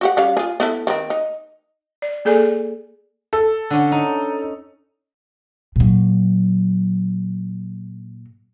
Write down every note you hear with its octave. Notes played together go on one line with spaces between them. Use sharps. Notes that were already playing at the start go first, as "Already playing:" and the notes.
F#4 G4 F#5
G3 C#4 F5
F4 G#4
B3 E4 A4
D#3 C4
D#4
D5
A#3 G#4 A4 D5 G#5
A4
D3 C#4
D#4
A#2 F#3